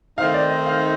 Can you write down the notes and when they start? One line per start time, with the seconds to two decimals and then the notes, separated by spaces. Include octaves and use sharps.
0.18 D#3 A3 C4 D#4 F5
0.34 D5
0.50 D#5
0.66 F5